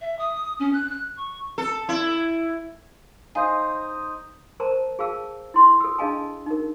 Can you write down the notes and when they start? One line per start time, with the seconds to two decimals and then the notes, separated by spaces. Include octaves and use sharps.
0.01 E5
0.19 D#6
0.60 C#4
0.73 F#6
0.90 F#6
1.17 C#6
1.58 A4
1.89 E4
3.35 D#4 C5 D#5 F5 G#5
4.60 A#4 C5 A5 A#5
4.99 G#4 F5 A5 E6
5.54 E4 C6
5.80 A4 E6
5.99 D4 G#4 D#5 F5 G#5 A5
6.46 D#4 A#4